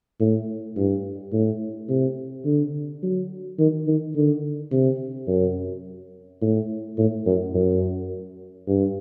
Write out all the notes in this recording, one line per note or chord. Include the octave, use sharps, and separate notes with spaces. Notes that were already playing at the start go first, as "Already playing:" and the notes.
A2
G2
A2
C3
D3
F#3
D#3
D#3
D3
C3
F#2
A2
A2
F#2
F#2
G2